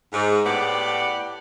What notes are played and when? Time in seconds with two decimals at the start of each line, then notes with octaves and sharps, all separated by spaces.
0.12 G#2
0.45 A2 B3 G4 D5 F#5